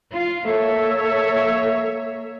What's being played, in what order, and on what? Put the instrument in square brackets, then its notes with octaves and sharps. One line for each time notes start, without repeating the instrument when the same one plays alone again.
[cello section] F4
[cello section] A#3 C#5 E5 [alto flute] A4